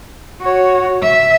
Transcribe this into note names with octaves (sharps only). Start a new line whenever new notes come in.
F#4 C#5
E5